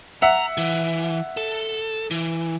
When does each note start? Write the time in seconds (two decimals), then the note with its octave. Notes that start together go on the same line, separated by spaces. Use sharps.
0.22 E5 F#5 A#5
0.58 E3
1.37 A4
2.11 E3